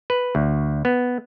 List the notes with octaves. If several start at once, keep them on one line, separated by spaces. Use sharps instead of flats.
B4
D2
B3